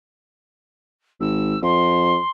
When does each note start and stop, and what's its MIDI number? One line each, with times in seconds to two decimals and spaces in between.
1.20 1.56 32
1.20 1.62 88
1.62 2.18 41
1.62 2.29 84